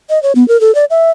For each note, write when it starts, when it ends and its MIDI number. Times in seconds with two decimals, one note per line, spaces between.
0.10 0.21 75
0.23 0.32 73
0.35 0.46 59
0.48 0.59 70
0.61 0.74 69
0.75 0.85 74
0.90 1.10 76